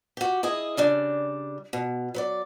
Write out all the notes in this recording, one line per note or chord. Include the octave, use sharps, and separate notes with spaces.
F#4 G4
E4 G#4 D#5
C#3 G3 D4
B2
F#3 B4 D5